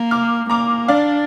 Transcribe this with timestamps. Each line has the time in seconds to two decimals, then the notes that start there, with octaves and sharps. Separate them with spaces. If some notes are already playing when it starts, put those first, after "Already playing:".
Already playing: A#3
0.11 D6 F6
0.50 A#3 A#5 D6
0.88 D4 D5 F5